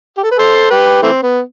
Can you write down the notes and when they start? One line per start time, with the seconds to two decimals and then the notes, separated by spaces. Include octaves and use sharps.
0.17 G4
0.23 A4
0.31 B4
0.38 A4 C5
0.70 G4 B4
1.02 E3 A3 C4
1.23 B3